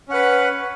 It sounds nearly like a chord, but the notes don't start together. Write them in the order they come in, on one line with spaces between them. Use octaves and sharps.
C#4 F#5 B4